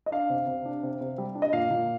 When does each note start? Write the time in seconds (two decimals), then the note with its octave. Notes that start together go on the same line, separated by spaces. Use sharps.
0.06 D#5
0.12 D4 F5
0.30 C3
0.47 C3
0.65 D4
0.83 C3
1.01 C3
1.18 G3
1.35 D4
1.42 D#5
1.53 A#2 F5
1.71 A#2